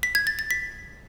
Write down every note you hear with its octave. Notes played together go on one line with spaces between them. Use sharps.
B6
G#6
A6
A6
B6